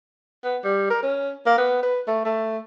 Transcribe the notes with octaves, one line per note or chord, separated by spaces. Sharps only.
B3
G3
A#4
C#4
A#3
B3
B4
A3
A3